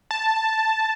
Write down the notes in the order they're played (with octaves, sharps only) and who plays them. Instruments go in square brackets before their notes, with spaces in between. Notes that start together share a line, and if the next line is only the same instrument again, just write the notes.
[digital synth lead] A5